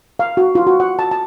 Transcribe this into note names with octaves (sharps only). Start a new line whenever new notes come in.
F5
F#4
F4
F#4
F#5
A5
A5